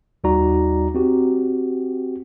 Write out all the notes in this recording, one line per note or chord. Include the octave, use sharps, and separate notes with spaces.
D#2 G3 D#4 F#4 D5 A#5
C4 F#4 G4